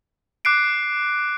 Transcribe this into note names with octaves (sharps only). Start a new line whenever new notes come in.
D6 F#6 C7 D7